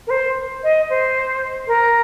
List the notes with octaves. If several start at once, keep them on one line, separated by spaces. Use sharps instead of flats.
A#4
C5
D#5
C5
A#4